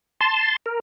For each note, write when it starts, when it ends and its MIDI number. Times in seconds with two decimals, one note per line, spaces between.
0.21 0.56 81
0.21 0.56 84
0.66 0.80 70